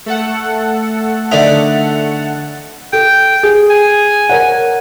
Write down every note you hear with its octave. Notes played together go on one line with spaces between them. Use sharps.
A3 A4 F#5
D3 D#4 D5 E5
A4 G5
G#4
G#5
A#4 C#5 F#5